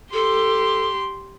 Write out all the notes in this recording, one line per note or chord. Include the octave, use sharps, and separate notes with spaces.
G4 A4 C6